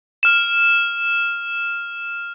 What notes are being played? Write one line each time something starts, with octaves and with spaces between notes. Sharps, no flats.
F6 E7